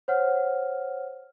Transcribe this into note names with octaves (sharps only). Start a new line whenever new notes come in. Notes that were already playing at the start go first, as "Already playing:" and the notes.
C5 C#5 F#5 F6